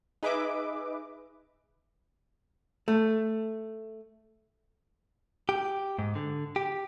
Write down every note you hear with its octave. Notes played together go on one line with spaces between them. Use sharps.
D#4 G#4 B4 D#5 E5 D6
A3
G4
G#2
D3
G4